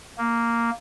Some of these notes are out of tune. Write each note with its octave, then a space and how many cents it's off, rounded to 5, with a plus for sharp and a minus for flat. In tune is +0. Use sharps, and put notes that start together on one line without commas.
A#3 -5